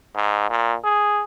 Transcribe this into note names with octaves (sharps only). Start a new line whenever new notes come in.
G#2
A#2
G#4